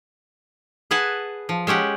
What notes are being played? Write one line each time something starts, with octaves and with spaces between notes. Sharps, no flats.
G#4 B4 F#5 G#5 A5
F3
G#3 C#4 G4 F#5